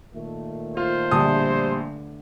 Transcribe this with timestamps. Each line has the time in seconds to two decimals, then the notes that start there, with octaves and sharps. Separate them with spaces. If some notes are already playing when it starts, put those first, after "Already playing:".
0.14 A#2 D#3 A3
0.77 F4 C5
1.11 A#1 D3 G3 A3 B3 A5 D#6